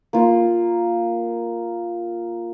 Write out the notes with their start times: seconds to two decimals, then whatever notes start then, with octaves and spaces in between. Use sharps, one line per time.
0.13 A#3 F4